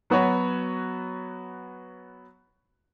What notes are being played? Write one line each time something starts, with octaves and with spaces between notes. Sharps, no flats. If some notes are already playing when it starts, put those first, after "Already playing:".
F#3 B3 F#4 B4 C#5